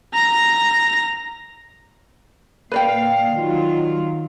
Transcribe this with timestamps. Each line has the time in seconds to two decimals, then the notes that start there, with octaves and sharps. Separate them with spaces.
0.14 A#5 A#6
2.72 A#2 B4 D5 F5 G5
3.32 D#3 F#3 F4